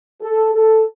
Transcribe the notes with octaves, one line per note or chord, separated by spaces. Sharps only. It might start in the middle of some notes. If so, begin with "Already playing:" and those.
A4
A4